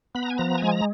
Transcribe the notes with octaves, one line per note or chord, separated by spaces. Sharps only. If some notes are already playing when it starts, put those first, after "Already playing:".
B3 B5
A#5
G#5
F3 A#5
G#3 G#5
A#5